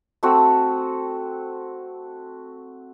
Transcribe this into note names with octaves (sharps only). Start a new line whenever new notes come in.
A3 C4 F#4